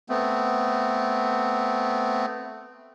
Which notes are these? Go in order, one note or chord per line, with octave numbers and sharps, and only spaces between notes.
A3 B3 C4